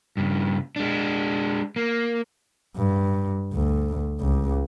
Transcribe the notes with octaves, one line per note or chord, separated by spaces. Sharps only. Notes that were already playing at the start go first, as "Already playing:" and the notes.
G2 C#3
G#3 D4
A#3
G2
D2
C#2